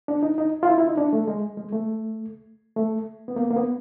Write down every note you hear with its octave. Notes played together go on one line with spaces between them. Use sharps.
D4
D#4
D#4
F4
E4
E4
D#4
D4
A3
G#3
G#3
A3
A3
B3
A#3
A#3
B3